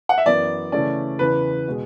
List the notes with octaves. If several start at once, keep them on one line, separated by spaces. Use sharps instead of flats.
F#5
E5
F#2 E3 B3 D5
C#3 E3 A3 C#4 D5
E2 C#3 E3 B4
B2 G#3